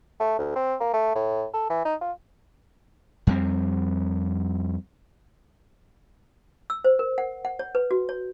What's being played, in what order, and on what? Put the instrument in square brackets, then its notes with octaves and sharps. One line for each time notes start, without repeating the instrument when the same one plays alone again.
[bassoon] A3
D2
C4
A#3
A3
A2
A4
E3
D#4
F4
[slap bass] F2 G3 C4
[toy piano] E6
C5
A#4
F#5
F#5
C#5
B4
F#4
C#5